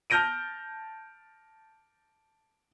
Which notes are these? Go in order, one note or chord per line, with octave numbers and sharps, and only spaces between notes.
A5 F6 G6 A#6 D7 D#7